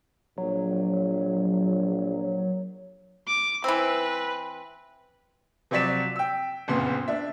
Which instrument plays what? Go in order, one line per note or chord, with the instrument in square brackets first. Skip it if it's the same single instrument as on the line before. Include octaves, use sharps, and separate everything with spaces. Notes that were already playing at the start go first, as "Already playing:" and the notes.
[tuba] A#1 [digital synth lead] F#3
[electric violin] D6
[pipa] E3 C4 [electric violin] B4
[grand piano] C3 F3 F#3 D5 B6 E7
G5 E6
F#1 F2 A#2 C#3 B3 C6
D4 E5